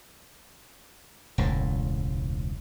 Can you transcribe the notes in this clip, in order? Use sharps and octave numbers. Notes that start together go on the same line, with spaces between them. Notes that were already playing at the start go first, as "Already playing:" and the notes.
E1 C#2 A2